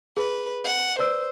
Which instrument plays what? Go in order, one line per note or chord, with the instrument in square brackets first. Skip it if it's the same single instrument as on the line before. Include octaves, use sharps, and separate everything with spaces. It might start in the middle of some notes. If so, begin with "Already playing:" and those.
[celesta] G#4 [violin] B4
[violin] F#5
[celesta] B4 D5 E6 [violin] C5